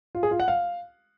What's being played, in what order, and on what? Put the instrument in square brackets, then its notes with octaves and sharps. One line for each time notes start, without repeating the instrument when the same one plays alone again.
[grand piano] F4
G#4
F4
F#5
F5